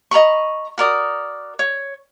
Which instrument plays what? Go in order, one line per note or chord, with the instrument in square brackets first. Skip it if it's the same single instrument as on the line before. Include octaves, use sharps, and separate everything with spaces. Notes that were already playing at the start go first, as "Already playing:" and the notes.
[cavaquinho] D#5 A#5 B5 C#6
F#4 A#4 D5 D#6
C#5